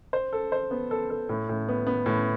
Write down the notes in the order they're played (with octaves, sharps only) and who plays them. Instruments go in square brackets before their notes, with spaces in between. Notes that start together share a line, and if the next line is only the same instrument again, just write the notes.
[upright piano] C5
A4
C5
B3
A4
A4
A2
A2
B3
B3
A2